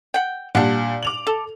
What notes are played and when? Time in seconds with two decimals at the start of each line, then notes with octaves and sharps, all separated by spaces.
0.14 F#5 G5
0.55 A#2 G3 D4 F#5
1.03 D6 F7 F#7
1.27 A4